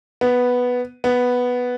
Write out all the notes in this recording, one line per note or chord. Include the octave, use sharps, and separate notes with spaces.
B3
B3